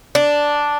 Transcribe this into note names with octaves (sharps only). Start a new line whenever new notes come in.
D4